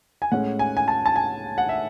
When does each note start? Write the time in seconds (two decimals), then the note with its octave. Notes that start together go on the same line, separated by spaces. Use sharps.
0.22 G#5
0.32 A2 G#3 C#4 F#5
0.59 G#5
0.77 G#5
0.88 A5
1.06 A5
1.16 G#5
1.58 F#5
1.69 E5